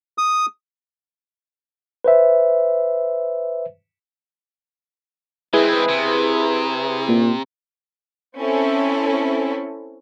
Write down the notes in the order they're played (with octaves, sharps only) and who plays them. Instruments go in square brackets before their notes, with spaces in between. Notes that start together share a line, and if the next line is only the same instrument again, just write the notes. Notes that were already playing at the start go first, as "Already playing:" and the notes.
[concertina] D#6
[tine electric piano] B4 C5 E5
[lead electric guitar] G#3 C4 [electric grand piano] E4 G#4 B4
[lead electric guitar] C3
[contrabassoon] A#2
[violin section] C4 C#4 E4 A4